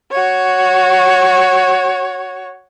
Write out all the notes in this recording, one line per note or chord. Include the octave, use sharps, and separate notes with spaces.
F#4 C#5